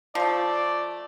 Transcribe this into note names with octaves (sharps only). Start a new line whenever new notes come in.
F3 A3 D5